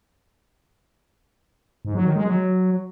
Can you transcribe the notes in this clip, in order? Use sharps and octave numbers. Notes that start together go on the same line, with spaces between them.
G#2
F#3
D#3
G#3
F#3